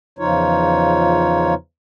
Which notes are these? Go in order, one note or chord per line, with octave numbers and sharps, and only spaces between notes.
E2 C#3 F3 D#4 F4 C#5